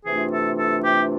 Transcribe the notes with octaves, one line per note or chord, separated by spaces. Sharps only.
C3 E3 A3 D4 F4 G#4
A4
A4
G4